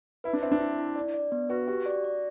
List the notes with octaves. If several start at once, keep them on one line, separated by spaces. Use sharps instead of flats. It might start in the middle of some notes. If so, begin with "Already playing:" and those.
E4 B4
D4
C4 E5
D4
E4
E4
D5
D5
B3
F#4 B4
F#4 G4
D5
D5